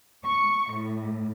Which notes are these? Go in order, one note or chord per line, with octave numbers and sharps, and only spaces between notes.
C#6
A2